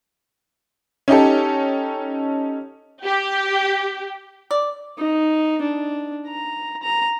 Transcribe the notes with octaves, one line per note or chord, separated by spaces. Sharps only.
C#4 D#4 G4 A4
G4
D5
D#4
D4
A#5
A#5